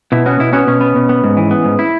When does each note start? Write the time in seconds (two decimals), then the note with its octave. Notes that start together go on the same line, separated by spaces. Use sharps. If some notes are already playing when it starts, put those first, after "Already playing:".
0.12 B2 E4
0.26 B3 C#4 F#4
0.40 B2 E4
0.53 B3 C#4 F#4
0.68 B2 C#4
0.81 B3
0.96 B2
1.09 B3
1.24 G#2
1.37 E3
1.51 B3
1.64 G#2
1.79 E4